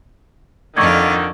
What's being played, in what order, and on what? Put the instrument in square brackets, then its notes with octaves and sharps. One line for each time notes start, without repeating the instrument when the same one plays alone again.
[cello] F2 F4 [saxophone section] D3 D#3 [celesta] C#6 D6 G#6